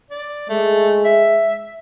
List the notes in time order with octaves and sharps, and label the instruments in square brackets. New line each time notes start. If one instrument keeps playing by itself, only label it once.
[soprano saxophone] D5
[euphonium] G#3 [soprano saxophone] A3
[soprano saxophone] E5